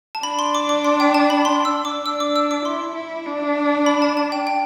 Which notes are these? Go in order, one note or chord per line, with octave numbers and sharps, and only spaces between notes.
A5
D4 B5
C6
D6
D6
C6
G5
A5
B5
C6
E6
D6
D4 E6
D6
E6
D6
E4 C6
E4
D4
B5
A5
A5
G5
G5